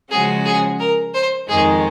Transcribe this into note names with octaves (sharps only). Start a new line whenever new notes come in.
C#3 F3 G#3 C#4 F#4 G#4
G#4
A#4
C5
F2 D#3 G#3 D#4 G#4